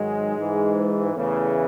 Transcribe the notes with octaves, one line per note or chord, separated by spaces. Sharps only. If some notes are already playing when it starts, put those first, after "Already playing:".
Already playing: G#2 D#3 F#3 G#3
G#2 E3
E2 C#3 E3 A3